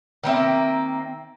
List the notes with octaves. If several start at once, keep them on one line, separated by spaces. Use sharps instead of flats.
D#3 A#3 C4 E5